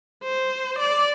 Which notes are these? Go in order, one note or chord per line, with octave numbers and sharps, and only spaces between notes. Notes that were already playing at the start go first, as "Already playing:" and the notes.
C5
D5